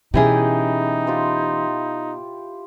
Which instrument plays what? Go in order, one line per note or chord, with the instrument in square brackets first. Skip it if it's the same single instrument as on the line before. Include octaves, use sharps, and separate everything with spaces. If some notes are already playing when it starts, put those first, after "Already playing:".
[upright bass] B2 [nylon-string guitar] E3 C#4 G#4 [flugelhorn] D#4 [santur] E4 G4
[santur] F4 G4 C5